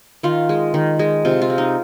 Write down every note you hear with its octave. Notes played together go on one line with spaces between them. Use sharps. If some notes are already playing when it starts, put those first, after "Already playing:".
D#3 F4
G#3
D#3
G#3
C3 F4
F4
G#3
D#4